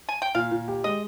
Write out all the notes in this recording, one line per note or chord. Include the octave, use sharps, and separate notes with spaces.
G#5
G5
A#2 F5
A#2
G4
G#3 D#5